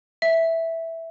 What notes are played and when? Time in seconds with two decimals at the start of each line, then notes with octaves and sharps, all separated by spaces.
0.22 E5